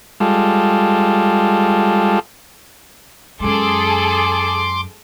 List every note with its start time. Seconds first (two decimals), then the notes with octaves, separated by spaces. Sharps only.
0.20 G3 G#3 F4 A4
3.40 F#2 G#3 G#4 A4 C6 D6